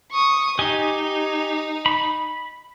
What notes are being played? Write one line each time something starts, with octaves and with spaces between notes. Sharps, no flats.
C#6 D#6
D#4 G4 D#5 G#5
B5